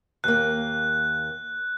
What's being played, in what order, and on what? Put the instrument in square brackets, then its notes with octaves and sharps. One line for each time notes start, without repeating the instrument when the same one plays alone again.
[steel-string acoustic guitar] D#2 A#3 [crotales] F#6